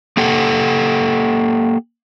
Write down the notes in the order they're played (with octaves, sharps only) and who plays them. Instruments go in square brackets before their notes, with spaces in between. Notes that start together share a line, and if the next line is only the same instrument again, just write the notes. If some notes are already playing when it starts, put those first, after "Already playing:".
[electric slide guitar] A#3 G4 A4 F#5